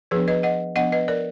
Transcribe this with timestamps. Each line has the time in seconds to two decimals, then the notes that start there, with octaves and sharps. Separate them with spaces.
0.11 F3 B3 D4 G#4 B4
0.28 B4 D#5
0.43 D#5 F#5
0.76 F3 B3 D4 D#5 F#5
0.92 B4 D#5
1.08 A#4 D5